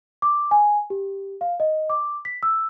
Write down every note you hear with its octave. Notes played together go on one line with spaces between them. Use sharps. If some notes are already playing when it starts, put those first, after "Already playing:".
D6
G#5
G4
F5
D#5
D6
B6
E6